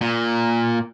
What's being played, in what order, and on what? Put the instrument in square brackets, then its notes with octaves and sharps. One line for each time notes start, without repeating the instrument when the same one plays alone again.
[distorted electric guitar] A#2